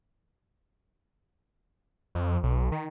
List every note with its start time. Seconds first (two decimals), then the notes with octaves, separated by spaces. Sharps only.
2.15 F2
2.43 B1
2.72 D#3